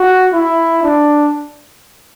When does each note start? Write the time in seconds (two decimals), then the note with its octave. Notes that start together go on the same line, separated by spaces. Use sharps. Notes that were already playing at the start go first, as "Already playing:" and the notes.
Already playing: F#4
0.33 E4
0.83 D4